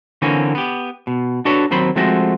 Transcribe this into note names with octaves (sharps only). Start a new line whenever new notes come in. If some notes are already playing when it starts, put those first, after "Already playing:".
D3 E3 A#3 C4 C#4
B3 G4
B2
D4 F#4 A4 B4 C#5
D#2 F#3 C4 C5 B5
F3 G#3 A3 C4 F#4